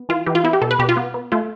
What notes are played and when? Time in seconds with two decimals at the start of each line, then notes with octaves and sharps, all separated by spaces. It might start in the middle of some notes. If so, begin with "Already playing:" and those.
Already playing: B3
0.09 E3 F4
0.26 E3 G4
0.35 F4
0.44 B3 E4
0.53 G4
0.62 B2 A4
0.71 B4
0.79 B2 G4
0.89 F4
0.97 B3
1.14 B3
1.32 A3 F4